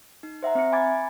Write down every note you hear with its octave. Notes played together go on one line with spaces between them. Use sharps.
D#4
C5 E5 F#5 A#5
C4 E5 C#7
G#5 B5 D6 G#6 A6